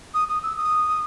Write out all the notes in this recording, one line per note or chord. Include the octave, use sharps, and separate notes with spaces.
D#6
D#6
E6
D#6